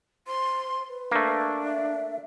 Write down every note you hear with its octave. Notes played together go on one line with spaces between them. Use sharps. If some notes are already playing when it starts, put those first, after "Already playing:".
C5 C6
B4
A3 A#3 D4
E5